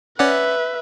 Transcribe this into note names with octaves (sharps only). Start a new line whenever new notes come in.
C#4 B4 D5 E5 F#5